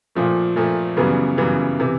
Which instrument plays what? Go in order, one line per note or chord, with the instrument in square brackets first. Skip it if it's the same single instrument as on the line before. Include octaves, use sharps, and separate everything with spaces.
[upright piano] A#2 F3 A3
A#2 F3 A3
F#2 C#3 E3 G3 B3
F#2 C#3 E3 G3 B3
C3 E3